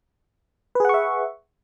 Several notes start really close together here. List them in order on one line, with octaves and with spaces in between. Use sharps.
B4 G#4 F#5 C#6 E5